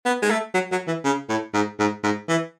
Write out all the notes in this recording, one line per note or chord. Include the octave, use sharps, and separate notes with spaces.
B3
G#3
A3
F#3
F#3
E3
C#3
A2
G#2
G#2
G#2
E3